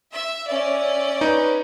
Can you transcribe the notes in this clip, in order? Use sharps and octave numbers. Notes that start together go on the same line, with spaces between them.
E5
C#4 D5 E5
D#4 B4